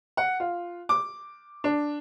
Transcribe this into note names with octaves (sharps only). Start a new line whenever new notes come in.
F#5
F4
D6
D4